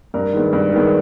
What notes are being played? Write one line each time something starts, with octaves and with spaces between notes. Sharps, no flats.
G2 A#4
D#3 G#3 B3
G2
D#3 G#3 B3